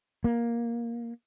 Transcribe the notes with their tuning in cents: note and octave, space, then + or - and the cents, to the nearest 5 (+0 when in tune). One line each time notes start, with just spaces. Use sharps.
A#3 +10